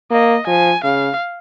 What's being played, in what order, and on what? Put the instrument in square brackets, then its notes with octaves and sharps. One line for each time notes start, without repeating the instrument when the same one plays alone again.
[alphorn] A#3 [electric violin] D#5
[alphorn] F3 [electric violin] G#5
[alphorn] C#3 [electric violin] F5